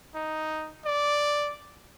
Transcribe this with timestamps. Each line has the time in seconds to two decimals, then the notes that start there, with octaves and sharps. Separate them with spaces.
0.15 D#4
0.85 D5